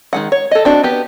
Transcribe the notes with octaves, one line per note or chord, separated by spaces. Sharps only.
D#3 G#3 F#5
C#5
A4 D#5
C4 D4 F#4
B3 G4 B4